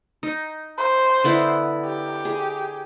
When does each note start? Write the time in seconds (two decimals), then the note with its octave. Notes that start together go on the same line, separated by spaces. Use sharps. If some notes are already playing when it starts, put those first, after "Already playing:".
0.23 D#4
0.78 C5
1.24 D3 B3 E4
1.85 G4
2.25 G#4